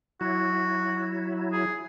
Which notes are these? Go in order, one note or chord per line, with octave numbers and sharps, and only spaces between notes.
F#3 E4 F#4
G#4